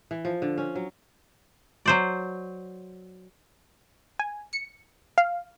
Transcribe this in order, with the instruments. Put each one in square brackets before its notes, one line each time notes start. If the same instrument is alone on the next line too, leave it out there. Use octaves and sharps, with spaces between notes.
[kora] E3
F3
D3
C#4
F#3
[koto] F#3 C5 D5
[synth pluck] G#5
C#7
F5